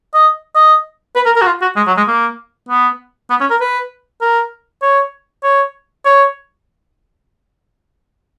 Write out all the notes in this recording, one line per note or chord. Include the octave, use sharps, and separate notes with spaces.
D#5
D#5
B4
A#4
A#4
F#4
F4
F#4
G#3
F#3
G#3
A#3
B3
B3
C#4
A#4
B4
A#4
C#5
C#5
C#5